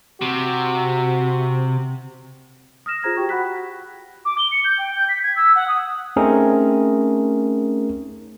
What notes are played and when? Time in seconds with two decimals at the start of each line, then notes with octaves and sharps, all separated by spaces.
0.21 C3 F#4
2.86 D#6 F6 A#6 E7
3.03 F4 G#4 C5 A#5 G#6 A#6
3.17 F#4 G4 G5 C#6
3.29 F#5 B5 F#6 B6
4.25 D6
4.38 G7
4.52 C#7
4.65 G6
4.79 G5
4.96 G6
5.09 B6
5.24 G#6
5.36 E6
5.55 F#5
5.68 D#6
6.16 A3 C4 C#4 D#4 G#4 A#4